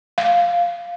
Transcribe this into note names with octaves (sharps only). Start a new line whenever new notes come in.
F5